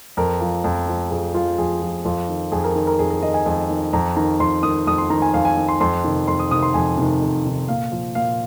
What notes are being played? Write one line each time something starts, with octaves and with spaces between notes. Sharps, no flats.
F2 A#4
F3
F2
F3
F2 G#4
F3 F4
F2 G#4
F3
F2 F4
D#3
F2 G#4
A#4
D#3
A#4
F2 G#4
A#4
D#3 D#5
G#5
F2
D#3
F2 A#5
D#3 A#5
F2 C6
D#3 D#6
F2 D#6
C6
D#3 A#5
G#5
F2 F5
G#5
D#3
C6
F2 C6
C3 D#3
F2 C6
D#6
C3 D#3 D#6
C6
F2 G#5
C3 D#3
F2
C3 D#3
A#2 F5
F3
A#2 F5